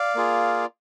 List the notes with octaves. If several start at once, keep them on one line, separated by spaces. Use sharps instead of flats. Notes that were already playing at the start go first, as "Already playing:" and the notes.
Already playing: D5 F5
A#3 F4 G#4